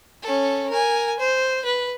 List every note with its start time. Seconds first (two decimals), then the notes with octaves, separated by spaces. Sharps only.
0.23 C#4 A4
0.69 A#4 G#5
1.20 C5
1.65 B4